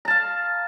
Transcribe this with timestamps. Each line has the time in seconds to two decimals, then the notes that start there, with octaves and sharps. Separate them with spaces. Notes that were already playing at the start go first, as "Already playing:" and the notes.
0.05 A#5
0.08 A5
0.10 F5